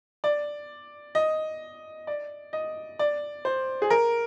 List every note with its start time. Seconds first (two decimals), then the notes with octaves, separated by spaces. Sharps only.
0.24 D5
1.15 D#5
2.07 D5
2.53 D#5
2.99 D5
3.45 C5
3.82 G#4
3.90 A#4